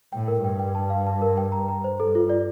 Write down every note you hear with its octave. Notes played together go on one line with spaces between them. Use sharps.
A2 G5
A#4
G2 G5
G5
A5
F5
A5
A#4
G5
A#5
A#5
C5
G2 A4
F4
D5